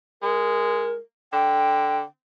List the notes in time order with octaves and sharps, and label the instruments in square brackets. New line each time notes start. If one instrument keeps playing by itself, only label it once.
[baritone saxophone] G#3 [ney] A#4
[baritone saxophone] D3 [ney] G5